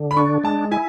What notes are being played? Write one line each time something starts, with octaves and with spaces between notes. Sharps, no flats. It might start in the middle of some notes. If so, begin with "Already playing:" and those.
Already playing: D3
B5
D4 C#6
G#3 A5
E4 G#5